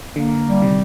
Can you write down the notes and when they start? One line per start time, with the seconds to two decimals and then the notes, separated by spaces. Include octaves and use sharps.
0.16 D3 A#3
0.46 G3
0.62 C3 D#3